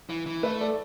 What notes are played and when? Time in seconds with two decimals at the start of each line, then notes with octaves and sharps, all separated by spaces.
0.10 E3
0.26 E3
0.43 A3 B4 E5
0.61 A4 D5